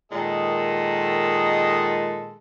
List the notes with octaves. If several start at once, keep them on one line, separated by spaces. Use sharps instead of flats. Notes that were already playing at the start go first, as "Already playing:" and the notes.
A#2 D#3 G#3 A4 D#5